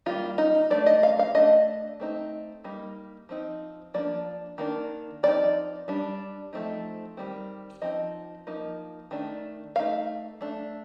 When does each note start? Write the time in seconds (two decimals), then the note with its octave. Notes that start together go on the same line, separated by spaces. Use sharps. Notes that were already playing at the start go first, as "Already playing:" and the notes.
0.06 D#3 G3 A#3 F4
0.38 D#4
0.70 A3 D4 D5
0.86 D#5
1.03 F5
1.19 F5
1.35 A3 D4 D#5
2.00 A3 C4 D#4
2.64 G3 A#3 D#4
3.29 F3 C4 D#4
3.94 F3 A#3 D4 D5
4.58 D#3 A#3 D4
5.23 F3 C4 D#4 D5
5.88 G3 D4
6.53 F3 A3 C4 D#4
7.17 D#3 G3 C4
7.82 F3 C4 D#4 D#5
8.47 F3 A#3 D#4
9.11 D#3 A3 D4
9.76 A3 D#4 F5
10.41 A3 D4